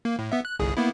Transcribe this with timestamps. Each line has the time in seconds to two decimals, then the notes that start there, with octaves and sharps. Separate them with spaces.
0.05 A#3
0.19 A2
0.32 B3 E5
0.45 F#6
0.60 G1 C2 G#4
0.77 A#3 B3 E4